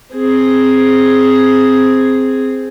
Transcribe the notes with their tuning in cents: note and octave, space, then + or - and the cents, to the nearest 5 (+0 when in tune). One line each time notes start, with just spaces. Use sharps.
C4 +0 G#4 +0